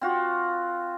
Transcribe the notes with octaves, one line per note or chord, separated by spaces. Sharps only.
C4 F4 F#4